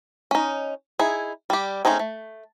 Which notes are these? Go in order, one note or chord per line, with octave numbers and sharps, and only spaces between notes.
C#4 D#4
D#4 E4 G#4
G3 G4
A3 C4 C#4 D#4 G#4
A3